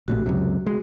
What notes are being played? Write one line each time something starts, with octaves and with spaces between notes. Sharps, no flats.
A#1 A2 C3 F#4
C#2 F#2 C3
G#3